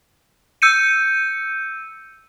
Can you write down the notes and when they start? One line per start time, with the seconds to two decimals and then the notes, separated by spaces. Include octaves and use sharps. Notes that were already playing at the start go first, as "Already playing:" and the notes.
0.62 E6 G6 C#7 D#7